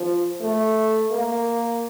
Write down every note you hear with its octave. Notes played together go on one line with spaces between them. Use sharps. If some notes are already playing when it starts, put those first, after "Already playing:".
Already playing: F3
A3
A#3